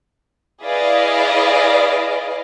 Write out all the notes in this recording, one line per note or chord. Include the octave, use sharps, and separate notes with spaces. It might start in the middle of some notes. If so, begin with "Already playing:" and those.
E4 G#4 B4 D5 D#5 F5